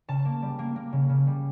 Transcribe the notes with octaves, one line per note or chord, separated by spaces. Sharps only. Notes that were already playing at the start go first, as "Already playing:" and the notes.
C#3 A5
A#3
G3
A#3
A#3
C#3
C#3
G3